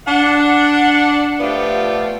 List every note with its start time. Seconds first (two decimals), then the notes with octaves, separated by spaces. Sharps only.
0.07 D4 F#5
1.40 F3 A3 B3 F4 G4 D5